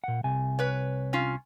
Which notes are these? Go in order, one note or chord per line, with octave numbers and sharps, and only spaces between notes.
A#2 F#5
C2 C3 G#5
B4 C#5
C#4 F4